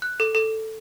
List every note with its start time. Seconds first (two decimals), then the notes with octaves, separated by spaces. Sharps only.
0.02 F#6
0.20 A4
0.35 A4